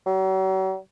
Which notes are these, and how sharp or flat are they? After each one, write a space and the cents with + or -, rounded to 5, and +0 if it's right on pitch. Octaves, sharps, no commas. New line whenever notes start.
F#3 +45